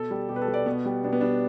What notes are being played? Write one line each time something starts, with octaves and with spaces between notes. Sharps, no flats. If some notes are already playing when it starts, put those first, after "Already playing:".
Already playing: B2 A4
G3
B2 G4
B4
A4
G3
D5
B2 B3
G3
B2 D4
B3
G3 D4